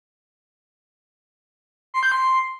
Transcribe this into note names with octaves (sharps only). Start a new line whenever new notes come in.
C6
G6
C6